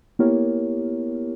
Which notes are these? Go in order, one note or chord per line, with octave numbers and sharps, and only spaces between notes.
A#3 B3 E4 G4 A#4 C#5